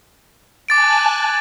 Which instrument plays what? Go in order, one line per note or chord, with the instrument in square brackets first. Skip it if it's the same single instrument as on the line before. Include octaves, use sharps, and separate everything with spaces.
[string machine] G#5 A5 F#6 [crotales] D6 A6 D7